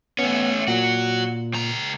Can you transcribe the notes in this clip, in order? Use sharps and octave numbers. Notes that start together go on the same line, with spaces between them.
A3 B3 C#4
A#2 F#3 F#4
C#2 A#5